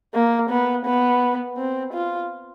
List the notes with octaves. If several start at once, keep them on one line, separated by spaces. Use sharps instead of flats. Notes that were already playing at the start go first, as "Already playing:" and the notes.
A#3
B3
B3
C4
F4